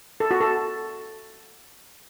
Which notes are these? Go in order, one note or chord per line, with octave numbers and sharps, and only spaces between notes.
A4
F#4
A4